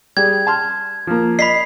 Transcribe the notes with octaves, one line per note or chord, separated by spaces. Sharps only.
G3 G#4 G#6
A5 C6 F6
F3 A#3
D#5 B5 B6 C7